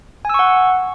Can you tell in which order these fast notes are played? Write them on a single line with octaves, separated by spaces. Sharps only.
G#5 E6 C#6 F#5